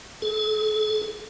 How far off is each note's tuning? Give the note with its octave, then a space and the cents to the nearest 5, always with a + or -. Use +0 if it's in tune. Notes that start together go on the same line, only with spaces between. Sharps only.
A4 -45